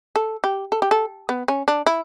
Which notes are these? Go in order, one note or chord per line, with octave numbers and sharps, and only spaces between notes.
A4
G4
A4
G4
A4
B3
C#4
D4
E4